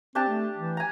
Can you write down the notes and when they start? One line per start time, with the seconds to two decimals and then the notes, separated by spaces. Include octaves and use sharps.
0.15 C4 D4 G4 A5
0.28 A3
0.58 E3
0.77 G#5 A#5